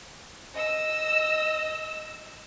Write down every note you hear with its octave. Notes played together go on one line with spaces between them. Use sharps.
D#5 E6